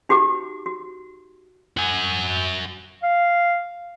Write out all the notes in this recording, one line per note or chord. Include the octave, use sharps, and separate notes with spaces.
D#4 F#4 G4 D6
F#4
F#4 G#5
F5